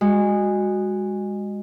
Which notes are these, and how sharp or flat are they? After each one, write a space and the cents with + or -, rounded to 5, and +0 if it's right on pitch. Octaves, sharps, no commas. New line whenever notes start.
G#3 -20 F#4 +0